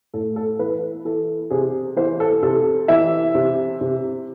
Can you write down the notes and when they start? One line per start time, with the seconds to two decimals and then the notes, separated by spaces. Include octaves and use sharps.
0.14 A2 A4
0.36 A4
0.59 E3 B4
1.05 E3 A4
1.50 C3 G#4
1.96 E3 C5
2.20 A4
2.43 C3 A4
2.88 E3 E5
3.35 C3
3.81 C3